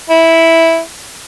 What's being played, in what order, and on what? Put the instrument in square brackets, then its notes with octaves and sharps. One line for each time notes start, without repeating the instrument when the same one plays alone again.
[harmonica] E4